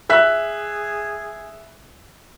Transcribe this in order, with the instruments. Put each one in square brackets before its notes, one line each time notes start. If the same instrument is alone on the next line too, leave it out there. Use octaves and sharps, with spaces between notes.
[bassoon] G#4 [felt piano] E5 F#6 B6